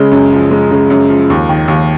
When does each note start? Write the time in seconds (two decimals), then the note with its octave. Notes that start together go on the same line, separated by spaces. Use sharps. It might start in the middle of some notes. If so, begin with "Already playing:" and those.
Already playing: C#3 G#3
0.12 F#2
0.32 F3
0.51 G#3
0.71 C#3
0.90 F#2
1.10 F3
1.30 D#2
1.49 D#3
1.68 D#2